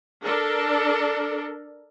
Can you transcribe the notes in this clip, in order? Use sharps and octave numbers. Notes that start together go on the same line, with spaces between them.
D4 A4 A#4